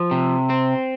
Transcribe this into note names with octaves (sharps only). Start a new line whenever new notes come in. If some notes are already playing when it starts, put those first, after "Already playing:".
Already playing: F3
C3
C4